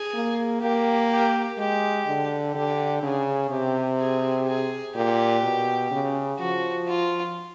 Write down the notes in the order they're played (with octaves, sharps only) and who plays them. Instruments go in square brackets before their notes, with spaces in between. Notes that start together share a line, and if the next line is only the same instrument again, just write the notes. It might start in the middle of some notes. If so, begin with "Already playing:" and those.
Already playing: [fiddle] G#4
[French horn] A#3
[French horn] A#3 [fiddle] G4
[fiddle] G4
[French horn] G#3 [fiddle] G4
[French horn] D3
[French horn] D3 [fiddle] G4
[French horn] C#3 [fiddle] G#4
[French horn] C3 [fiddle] G4
[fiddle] G#4
G#4
[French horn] A#2 [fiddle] G4
[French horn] B2
C#3
[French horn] F3 [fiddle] F#4
[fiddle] F4